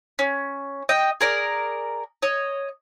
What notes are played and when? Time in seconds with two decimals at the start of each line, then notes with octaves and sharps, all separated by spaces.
0.19 C#4
0.89 D#5 G5
1.21 G#4 A#4 D5
2.22 C#5 D#5